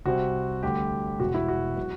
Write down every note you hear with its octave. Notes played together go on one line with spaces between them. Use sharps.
C2 C3 G3 C4 F#4
D2 D3 G3 G4
E1 E2 B2 F#4
E4
F#4
B2 F#3 B3